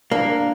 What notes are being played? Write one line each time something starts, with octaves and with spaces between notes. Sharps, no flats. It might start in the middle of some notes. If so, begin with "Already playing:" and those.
A#3 D4